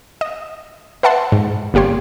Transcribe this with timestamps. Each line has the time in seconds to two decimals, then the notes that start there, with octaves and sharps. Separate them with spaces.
0.21 D#5
1.03 B4 E5 F#5 A5 C6
1.32 G#2
1.74 G1 A#3 G4 C#5 C6